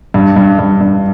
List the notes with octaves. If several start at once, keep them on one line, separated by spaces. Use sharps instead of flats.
G2
G2
G2
G2